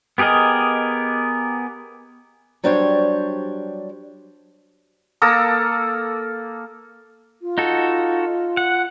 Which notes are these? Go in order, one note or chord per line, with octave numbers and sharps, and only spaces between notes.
B3 G4 G#4 A#4 D#5
F#3 G3 D4 G4 C5 C#5
A#3 A4 A#5 D#6
F4
D#4 F#4 A4
F#5